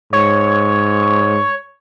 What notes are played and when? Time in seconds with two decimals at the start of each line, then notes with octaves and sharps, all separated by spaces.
0.13 G#2 C#5